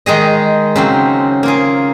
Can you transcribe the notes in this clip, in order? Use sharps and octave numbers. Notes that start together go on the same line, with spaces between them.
D#3 G#3 D#4 G#4 D#5
C#3 F#3 C4
A#3 F4 G#4